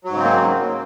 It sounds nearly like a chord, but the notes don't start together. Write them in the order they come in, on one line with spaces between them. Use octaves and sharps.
F#3 G#2 C#3 C4 A#3